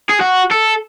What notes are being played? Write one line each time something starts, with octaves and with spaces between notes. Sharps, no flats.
G#4
F#4
A4